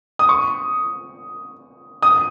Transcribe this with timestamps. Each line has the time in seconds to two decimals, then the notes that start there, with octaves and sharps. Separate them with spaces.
0.19 D#6
0.29 C#6
2.02 D#6